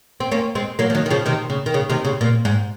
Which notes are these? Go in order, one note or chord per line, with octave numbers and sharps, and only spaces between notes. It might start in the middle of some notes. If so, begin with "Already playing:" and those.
C4
A#3 C#4
G#3 C4
F#3 A#3
F3
D#3 F#3
D#3
C#3 F3
C3 D#3
C#3
D#3
C#3
C3 D#3
C#3
A#2
G#2